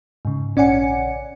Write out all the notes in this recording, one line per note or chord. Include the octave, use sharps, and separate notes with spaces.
G#2 C#3
A#1 C#4 D5 F#5 G#5 C#7